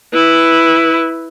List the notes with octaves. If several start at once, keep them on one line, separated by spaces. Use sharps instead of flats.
E4 B4